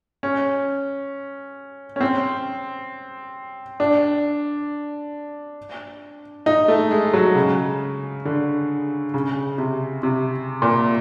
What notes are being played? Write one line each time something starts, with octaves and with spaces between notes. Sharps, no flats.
C#4
C#4
C4
D4
D#4
A3
G#3
F#3
C#3
D3
C#3
C3
C3
A#2